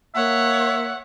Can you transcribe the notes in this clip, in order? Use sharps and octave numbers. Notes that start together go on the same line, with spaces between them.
A#3 C#5 E5 F#5